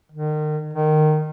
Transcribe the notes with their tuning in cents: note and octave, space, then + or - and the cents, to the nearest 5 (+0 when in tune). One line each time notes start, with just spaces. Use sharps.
D#3 -35
D#3 -20